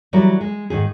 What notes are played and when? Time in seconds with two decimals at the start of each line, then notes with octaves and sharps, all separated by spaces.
0.13 E3 F#3 G3 A#4
0.41 G#3
0.70 G#2 D#3 G#4